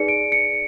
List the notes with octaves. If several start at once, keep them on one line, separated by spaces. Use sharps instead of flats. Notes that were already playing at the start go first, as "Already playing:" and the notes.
Already playing: D#4 G#4 B4 D5 C#7
D7
C#7